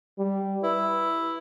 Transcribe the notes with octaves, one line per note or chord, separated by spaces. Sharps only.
G3
E4 B4